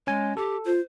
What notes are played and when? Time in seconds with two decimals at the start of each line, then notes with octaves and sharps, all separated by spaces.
0.07 G#3 C#4 G#5
0.37 G4 A4
0.66 F4 C5